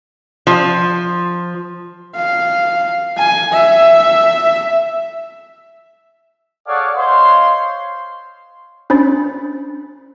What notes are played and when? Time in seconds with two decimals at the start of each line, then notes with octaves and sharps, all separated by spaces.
0.47 F3
2.16 F5
3.18 G#5
3.53 E5
6.67 G#4 A4 C#5 D5 F5 F#5
6.96 C5 C#5 D#5 F5 C6
8.90 C#4 D4 C5 B5 A6